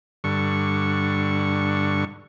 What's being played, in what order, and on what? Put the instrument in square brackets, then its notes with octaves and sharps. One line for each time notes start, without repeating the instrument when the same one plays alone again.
[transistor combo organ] G2 D3 C#6